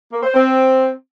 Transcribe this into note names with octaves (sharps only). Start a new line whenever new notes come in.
A#3
C5
C4